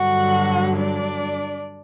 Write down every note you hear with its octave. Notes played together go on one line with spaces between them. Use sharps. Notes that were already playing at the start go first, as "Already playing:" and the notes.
Already playing: G2 D3 F#3 F#4 F#5
D4 D5